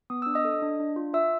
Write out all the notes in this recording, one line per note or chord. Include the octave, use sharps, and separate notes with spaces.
B3 D#6
D4 E6
D#5 D#6
A4
D4
D4
F4
F4 E5 E6